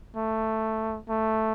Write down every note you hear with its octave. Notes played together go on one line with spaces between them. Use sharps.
A3
A3